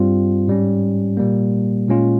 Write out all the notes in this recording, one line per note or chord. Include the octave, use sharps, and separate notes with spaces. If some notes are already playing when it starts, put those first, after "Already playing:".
Already playing: G2 G3 C4 F4
G#2 G3 C#4
A#2 G3 A#3
A#2 G#3 C#4 F4